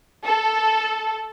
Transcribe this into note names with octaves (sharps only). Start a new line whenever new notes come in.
A4